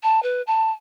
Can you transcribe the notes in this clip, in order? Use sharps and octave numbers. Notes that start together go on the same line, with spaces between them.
A5
B4
A5